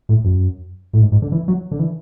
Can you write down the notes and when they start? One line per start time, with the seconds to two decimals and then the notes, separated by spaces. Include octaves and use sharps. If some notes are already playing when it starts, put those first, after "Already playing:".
0.09 A2
0.24 F#2
0.93 A2
1.01 G#2
1.12 G#2
1.22 D3
1.32 E3
1.48 F#3
1.71 D3
1.79 E3